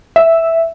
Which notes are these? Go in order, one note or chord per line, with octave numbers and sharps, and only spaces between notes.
E5